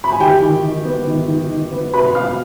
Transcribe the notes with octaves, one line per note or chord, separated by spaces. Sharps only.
B5
G#5
D#3 G4 G5
D#3
D#3
B3
D#3
D#3
D#3
B3
B2 B4 B5
B3 F5 F6